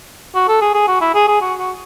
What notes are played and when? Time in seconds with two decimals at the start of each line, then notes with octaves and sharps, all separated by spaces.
0.35 F#4
0.48 A4
0.61 G#4
0.74 G#4
0.88 F#4
1.01 E4
1.15 G#4
1.28 G#4
1.41 F#4
1.59 F#4